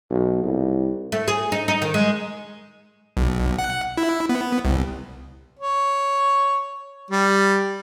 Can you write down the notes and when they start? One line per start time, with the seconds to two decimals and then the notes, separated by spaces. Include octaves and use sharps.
0.10 B1
0.43 C2
1.12 A3
1.28 G#4
1.52 D#4
1.68 D#4
1.82 D#3
1.94 G#3
3.17 B1
3.59 F#5
3.97 E4
4.29 B3
4.65 C2
5.59 C#5
7.11 G3